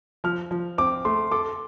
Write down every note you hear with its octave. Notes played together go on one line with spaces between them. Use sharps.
F3 F6
F3
C4 D6
A3 C6
A4 D6